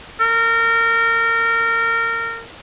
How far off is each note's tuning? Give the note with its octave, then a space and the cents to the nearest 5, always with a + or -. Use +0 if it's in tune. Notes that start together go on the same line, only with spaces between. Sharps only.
A#4 -25